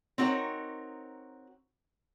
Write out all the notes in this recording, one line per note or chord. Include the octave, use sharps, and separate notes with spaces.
C4 D#4 F#4 A#4 C#5